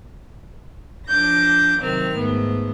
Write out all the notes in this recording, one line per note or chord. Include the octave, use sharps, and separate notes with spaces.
F3 D4 D6 G6 A#6
C3 D#3 F#3 C4 A#4 F6
G#2 A3 B3